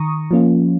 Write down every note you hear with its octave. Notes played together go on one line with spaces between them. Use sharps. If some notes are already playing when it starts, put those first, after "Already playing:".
Already playing: D#3 A#5 C#6 D#6
F3 A#3 C#4 F4